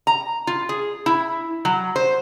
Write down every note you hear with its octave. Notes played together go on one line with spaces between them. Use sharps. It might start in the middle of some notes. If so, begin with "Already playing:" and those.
A#5
F4
G#4
E4
F#3
C5